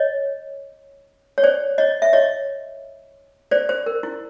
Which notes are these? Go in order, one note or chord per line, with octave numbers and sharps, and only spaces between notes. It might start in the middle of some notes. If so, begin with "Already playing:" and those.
Already playing: C#5 D#5
C#5
C5 D5
C#5 D#5
E5
C#5 D#5
C5 D5
C5
A#4
E4